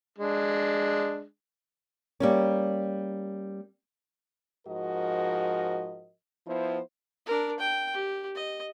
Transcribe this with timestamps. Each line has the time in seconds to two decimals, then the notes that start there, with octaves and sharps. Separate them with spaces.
0.18 G#3 D4
2.20 G3 A#3 C#4
4.67 G#2 F3 F#4 A#4 D#5
6.47 F3 B3 E4 C5
7.26 D4 A#4
7.60 G5
7.94 G4
8.35 D#5